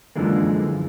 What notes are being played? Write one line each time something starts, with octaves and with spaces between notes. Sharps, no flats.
F#2 D3 E3 F3 G#3 A#3